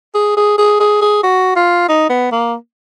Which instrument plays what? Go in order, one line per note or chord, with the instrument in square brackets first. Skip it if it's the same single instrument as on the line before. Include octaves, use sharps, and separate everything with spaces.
[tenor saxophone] G#4
G#4
G#4
G#4
G#4
F#4
F4
D#4
B3
A#3